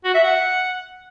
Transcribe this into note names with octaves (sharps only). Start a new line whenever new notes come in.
F#4
E5
F#5